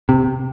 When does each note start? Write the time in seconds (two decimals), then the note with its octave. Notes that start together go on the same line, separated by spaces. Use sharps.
0.09 C3